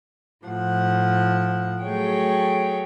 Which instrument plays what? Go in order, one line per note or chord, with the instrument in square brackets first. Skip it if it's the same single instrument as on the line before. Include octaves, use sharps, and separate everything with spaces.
[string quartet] A2 F3 F#5
F#3 A3 G#4 C#5 G5